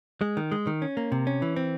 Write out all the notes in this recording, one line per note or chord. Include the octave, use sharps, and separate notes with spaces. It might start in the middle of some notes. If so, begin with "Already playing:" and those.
G#3
D#3
G#3
D#3
C#4
A#3
C3
C#4
E3
C4